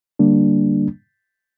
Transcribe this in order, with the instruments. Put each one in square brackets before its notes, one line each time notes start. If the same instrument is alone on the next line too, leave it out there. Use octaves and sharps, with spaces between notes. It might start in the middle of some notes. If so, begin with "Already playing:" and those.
[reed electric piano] D3 G3 A#3 D4